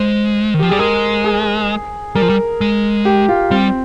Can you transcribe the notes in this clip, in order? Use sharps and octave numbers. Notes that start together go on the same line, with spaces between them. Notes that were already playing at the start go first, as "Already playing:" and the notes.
Already playing: G#3 C5
D#3
F3 G4
G3 G#4
G#3 A#4
G#4
G3 A#4
F3
G3
G#3
G4
F4
G3 C4